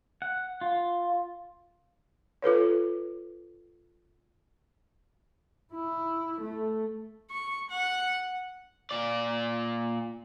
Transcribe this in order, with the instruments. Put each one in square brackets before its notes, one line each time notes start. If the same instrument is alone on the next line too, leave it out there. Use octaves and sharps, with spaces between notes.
[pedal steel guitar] F#5
F4
[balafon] F4 A4 B4 C#5
[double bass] E4
A3
[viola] C#6
F#5
[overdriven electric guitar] A#2 D5